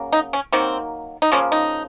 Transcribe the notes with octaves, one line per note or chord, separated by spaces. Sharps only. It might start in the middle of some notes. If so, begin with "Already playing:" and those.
Already playing: C#3 F#3 A#3
D#4
C#4
D#3 F#3 A#3 C4
D#4
C#3 F3 A#3 C#4
D#4